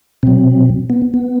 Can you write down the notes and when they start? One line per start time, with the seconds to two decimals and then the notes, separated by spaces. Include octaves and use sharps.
0.23 B2 F#3 C4
0.90 B3
1.14 B3